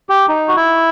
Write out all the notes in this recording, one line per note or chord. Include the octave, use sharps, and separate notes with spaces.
G4
D#4
F#4
E4